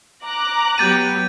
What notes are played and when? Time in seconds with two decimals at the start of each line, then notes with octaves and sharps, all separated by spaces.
0.24 A#5 D6 F#6
0.78 F#3 B3 G4 G6 A6 D#7